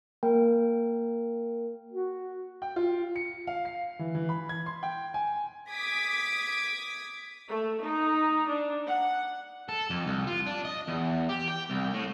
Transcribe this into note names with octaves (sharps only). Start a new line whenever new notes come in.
A#3 A#4 G5
F#4
G5
F4
C#7
F5
C7
E3
E3
B5
G#6
C6
G5
G#5
D6 D#6 G#6 B6
A3
D#4
D4
F#5
A4
F2
C2
F4
D4
D#5
E2
G4
G5
C2
A2